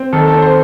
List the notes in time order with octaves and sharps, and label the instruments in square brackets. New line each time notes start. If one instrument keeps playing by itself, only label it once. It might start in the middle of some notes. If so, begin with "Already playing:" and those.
Already playing: [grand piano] C4
D#3 A4
A4
C4
C5